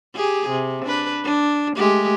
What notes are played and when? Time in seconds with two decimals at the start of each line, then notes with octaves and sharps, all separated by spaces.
0.15 G4 G#4
0.50 C3
0.85 D4 B4
1.24 D4
1.75 G#3 A3 G4